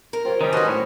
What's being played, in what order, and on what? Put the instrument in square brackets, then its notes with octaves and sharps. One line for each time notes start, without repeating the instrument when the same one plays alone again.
[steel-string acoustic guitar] A#4
[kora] C4 G4 C#5 [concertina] F4
[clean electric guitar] D#3 G3 [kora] C4 C#4 [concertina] A#5
[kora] C#4 C5 [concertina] F#4 B4 D#5 [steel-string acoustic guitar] G#5 A5
[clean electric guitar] A2 [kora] C4 C#4 [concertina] C#5